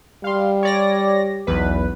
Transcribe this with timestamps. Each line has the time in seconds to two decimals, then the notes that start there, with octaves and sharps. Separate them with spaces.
0.24 G3 F5 C6
0.63 C#5 D5 A#6
1.47 B1 E2 B4